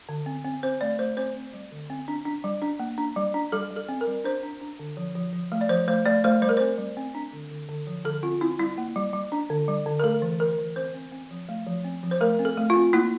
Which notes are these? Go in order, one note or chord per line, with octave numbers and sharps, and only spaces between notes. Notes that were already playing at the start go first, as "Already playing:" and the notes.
D3
C4
C4
C4 C5
A3 D5
A3 C5
C4 C5
C4
G3
D3
C4
D4
D4
G3
D4
A#3
D4
G3
D4
G3 A4
G3
A4
C4
A#4
G3
D4 C5
D4
D4
D3
F3
F3
F3
A3
D5
F3 C5
A3 C5
A3 D5
A3 C5
G3 C5
A#4
C4 C5
G3
C4
D4
D3
D3
D3
F3
D3 A4
C4 F4
C4 E4
G3 E4
A#3
G3
G3
D4
D3
G3
D3
A#4
A3 A4
E3
E3 A#4
E3
C4 C5
C4
C4
F3
A3
F3
C4
F3
C5
A3 A#4
C4
A4
A3
F4
C4
A#3 E4